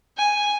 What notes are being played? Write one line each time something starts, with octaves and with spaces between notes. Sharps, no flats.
G#5